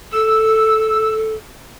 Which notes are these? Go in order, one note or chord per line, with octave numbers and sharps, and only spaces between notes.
A4 E6